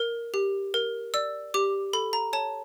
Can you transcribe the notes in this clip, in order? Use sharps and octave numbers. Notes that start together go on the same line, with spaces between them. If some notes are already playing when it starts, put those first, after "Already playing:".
Already playing: A#4
G4
A#4
D5 E6
G4 D6
A4 B5
A#5
C#5 A5